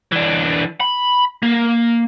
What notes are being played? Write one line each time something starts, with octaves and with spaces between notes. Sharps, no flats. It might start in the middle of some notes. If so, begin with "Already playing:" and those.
E3 D4
B5
A#3